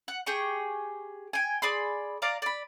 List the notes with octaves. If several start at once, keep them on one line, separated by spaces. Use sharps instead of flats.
F#5
G4 G#4 G5 C#6
G5 G#5
G#4 D5 B5 C6
D5 F5 A#5
D5 B5